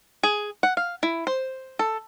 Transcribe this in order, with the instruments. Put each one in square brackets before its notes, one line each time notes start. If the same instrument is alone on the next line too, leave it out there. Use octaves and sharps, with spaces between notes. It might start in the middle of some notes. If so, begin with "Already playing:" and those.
[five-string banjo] G#4
F#5
F5
E4
C5
A4